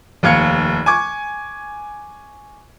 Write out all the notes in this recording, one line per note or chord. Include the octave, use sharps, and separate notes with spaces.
F1 D#2 F5 G#6 C#7
G#5 C#6 D6 G#6